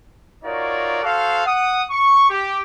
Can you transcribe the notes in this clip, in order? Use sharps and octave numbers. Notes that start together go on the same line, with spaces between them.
D#4 F4 F#4 A#4 C#5 D5
F#4 A4 C5 F5
F#5 D#6
C#6
G4